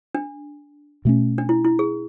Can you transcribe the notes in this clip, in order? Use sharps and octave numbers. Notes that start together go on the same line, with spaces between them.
D4
B2 A3 C#4
D4
E4
E4
G#4